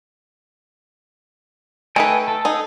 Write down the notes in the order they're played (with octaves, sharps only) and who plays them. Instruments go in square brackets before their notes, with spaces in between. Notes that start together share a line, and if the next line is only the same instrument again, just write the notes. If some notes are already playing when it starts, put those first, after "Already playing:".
[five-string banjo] A3 D#4 B4 [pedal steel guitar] A4 G5 G#5
[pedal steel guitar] A4
[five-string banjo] D#4 G#4